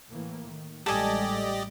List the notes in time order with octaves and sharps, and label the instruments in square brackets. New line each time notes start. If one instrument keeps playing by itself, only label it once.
[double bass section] A2 E3 A#3
D#3
[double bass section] A1 G3 G#3 [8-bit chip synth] G4 D5 D#5 [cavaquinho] A4 G#5